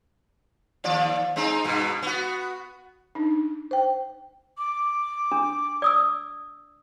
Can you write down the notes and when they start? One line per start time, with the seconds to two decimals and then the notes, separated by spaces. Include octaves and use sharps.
0.84 D#2 F3 D5
1.36 G#3 C4 D#4
1.64 G2 B2
2.02 B3 F#4
3.15 D4 D#4
3.71 C5 G5
4.58 D6
5.32 D4
5.82 D5 D#6 E6